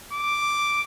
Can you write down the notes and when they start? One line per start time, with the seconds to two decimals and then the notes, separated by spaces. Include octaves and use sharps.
0.13 D6